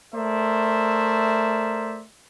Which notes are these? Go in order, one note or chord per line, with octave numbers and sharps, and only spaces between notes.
A3 A#4 C5 D5 E5